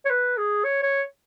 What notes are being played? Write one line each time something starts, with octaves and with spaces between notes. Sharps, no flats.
C#5
B4
G#4
C#5
C#5